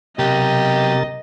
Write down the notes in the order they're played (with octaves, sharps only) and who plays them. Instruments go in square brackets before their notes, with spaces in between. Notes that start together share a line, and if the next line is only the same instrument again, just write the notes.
[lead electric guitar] B1 [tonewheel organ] C3 A#4 A6 [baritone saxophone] G4 [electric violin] D#5